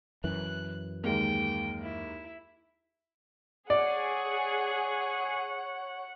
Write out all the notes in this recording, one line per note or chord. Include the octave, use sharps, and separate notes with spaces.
F#2 E3 F#6
D#2 G#3 A#3 G5
E4
G#4 C#5 D5 F#5